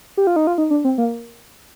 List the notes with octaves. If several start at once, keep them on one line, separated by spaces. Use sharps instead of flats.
G4
F4
D#4
F4
D#4
D4
C4
A#3